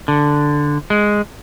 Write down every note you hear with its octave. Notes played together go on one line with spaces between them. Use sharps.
D3
G#3